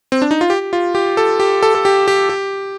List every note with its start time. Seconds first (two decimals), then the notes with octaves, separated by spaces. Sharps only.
0.12 C4
0.22 D4
0.31 D#4
0.41 F4
0.50 G4
0.73 F4
0.95 G4
1.17 A4
1.40 G4
1.63 A4
1.75 A4
1.85 G4
2.08 G4
2.29 G4